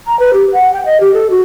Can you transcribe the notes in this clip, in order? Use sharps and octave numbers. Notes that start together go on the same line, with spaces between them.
A#5
B4
G4
F#5
G5
D#5
G4
A4
F#4